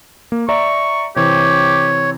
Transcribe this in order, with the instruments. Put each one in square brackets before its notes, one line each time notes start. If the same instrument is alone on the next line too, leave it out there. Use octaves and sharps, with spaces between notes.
[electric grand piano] A#3
[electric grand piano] D5 E5 A#5 [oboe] C#6
[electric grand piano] C3 E3 C4 [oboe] G4 [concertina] C#5